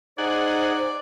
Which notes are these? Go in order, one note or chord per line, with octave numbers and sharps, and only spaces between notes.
D#4 G#4 C5 D5 F#5